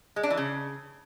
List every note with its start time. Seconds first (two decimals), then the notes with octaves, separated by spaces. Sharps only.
0.16 G#3
0.23 D4
0.30 E3
0.37 C#3